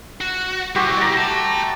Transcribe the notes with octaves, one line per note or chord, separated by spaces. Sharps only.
F#4
G3 E4 F#4 G4 C5
D5 A#5
E5 A5